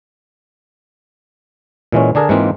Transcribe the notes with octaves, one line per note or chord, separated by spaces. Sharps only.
A#2 E3 G#3 C#4
D3 D4 G#4 A#4
G#2 E3 G#3 A#3 C4 F4